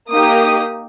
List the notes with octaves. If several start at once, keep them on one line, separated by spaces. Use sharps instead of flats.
A#3 D#4 G4 D#6